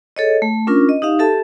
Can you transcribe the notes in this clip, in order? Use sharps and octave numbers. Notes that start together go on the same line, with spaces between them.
G#4 A4 C#5 D#5
A3
C#4 D4 F4 A#4
D#5
D#4 G4 E5 F5
G4 A4 E5 A5